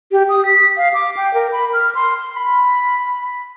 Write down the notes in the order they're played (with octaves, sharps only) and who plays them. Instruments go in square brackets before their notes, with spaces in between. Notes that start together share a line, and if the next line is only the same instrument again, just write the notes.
[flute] G4
D#6
B6
F5
D6
G5
A#4
B5
F6
C6
[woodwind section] B5